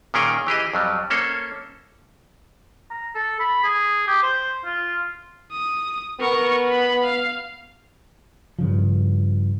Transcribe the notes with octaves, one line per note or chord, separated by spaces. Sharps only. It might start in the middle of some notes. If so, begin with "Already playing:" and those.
A#2 D#3 C#4 G#4 A#4 G5
E3 G4 G#4 D#5
F2 F#3 G3
A#3 C#4 A4 C5 C#5
A#5
A4
B5
G#4
G4
C5
F4
D#6
B3 A#4 C#6
B5
F5
G2 C#3 F3